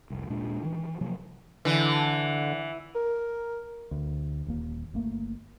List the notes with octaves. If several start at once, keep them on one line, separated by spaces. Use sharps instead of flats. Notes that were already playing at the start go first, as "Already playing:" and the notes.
F1 C2
D#1 A#2 G#3 D4
D#3 E3
C3 F3 F#3 A#3
D3 E3
A#4
D2
D#1 D#2 A#3
G1 A3 A#3